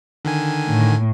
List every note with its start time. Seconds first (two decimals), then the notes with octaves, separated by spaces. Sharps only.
0.25 D3 D#3 G#5
0.68 A2